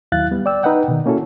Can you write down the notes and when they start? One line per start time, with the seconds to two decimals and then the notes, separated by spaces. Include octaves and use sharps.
0.12 D#2 F#3 E4 F5 F#6 A6
0.31 G3 B3
0.46 D5 G5 E6
0.63 D#4 B4 D#5 F#5 G5
0.88 B2 D#3
1.06 A#3 C#4 E4 F#4 A4